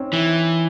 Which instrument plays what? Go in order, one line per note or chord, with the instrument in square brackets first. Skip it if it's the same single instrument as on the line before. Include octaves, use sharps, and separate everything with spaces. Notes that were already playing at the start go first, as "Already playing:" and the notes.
Already playing: [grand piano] C4 C#4 D#4
[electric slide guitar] E3